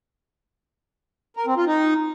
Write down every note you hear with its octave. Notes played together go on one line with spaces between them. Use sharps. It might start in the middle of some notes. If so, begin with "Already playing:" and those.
A#4
C4
F4
D#4